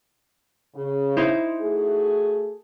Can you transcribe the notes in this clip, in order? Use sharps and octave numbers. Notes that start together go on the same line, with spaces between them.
C#3
D#4 E4 C5
A3 F#4 G#4